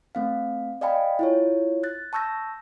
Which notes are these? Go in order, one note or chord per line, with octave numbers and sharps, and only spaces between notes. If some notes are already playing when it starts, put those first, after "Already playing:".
A3 C4 F5
D5 D#5 F5 G5 G#5 B5
E4 F4 C#5
F#6 A6
A5 C#6 E6 G6 A#6